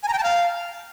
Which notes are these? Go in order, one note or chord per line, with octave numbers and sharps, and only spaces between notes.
G#5
A#5
G5
A5
F5